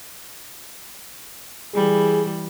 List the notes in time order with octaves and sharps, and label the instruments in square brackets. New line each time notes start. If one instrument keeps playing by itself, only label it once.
[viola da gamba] E3 G3 [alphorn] G#4